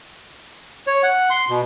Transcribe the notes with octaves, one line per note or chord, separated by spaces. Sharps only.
C#5
F#5
C6
B2